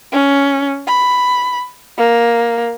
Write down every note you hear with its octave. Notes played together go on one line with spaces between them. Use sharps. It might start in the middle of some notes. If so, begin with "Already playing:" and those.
C#4
B5
A#3